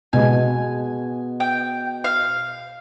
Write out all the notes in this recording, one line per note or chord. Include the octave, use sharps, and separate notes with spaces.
B2 G#3 B3 G#5
G5
F5